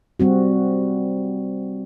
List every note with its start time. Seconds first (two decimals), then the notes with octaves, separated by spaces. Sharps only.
0.20 G3 C4 F#4